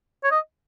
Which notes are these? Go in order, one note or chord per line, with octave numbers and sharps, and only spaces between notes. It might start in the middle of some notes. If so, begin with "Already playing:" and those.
C#5
D#5